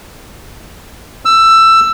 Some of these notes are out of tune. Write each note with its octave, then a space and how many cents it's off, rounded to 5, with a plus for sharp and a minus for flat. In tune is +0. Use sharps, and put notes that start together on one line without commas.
E6 +15